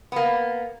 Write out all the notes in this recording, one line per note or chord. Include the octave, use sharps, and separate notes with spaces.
A#3 B3